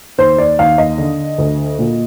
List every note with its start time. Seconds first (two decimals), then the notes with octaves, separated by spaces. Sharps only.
0.18 D#2 C5
0.38 D5
0.59 D#2 F5
0.78 D#5
0.98 D3
1.38 D2
1.79 A#2